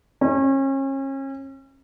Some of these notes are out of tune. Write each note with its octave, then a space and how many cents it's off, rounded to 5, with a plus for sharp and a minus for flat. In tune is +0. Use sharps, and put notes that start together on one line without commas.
C#4 -35